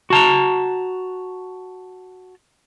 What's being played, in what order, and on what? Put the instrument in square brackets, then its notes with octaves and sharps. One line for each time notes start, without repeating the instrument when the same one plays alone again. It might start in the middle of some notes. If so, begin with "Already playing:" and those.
[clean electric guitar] F#4 A5 A#5